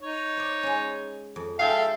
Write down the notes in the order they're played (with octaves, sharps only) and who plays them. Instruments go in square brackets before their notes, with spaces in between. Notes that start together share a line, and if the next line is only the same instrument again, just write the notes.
[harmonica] D#4 C#5
[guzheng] C5 D5
G#3 C#4
F2
[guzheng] G#3 D#4 F#4 [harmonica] A4 E5 G5 [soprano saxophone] F5